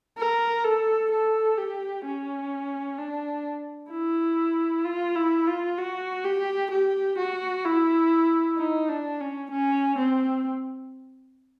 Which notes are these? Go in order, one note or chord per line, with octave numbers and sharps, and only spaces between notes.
A#4
A4
A4
G4
C#4
D4
E4
F4
E4
F4
F#4
G4
G4
F#4
E4
D#4
D4
C#4
C#4
C4